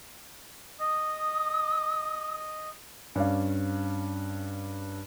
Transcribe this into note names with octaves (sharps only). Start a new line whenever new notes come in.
D#5 D#6
G2 C#4 D5 F5